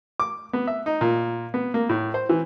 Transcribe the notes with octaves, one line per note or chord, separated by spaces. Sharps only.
D6
B3
E5
D#4
A#2
B3
A#3
A2
C5
E3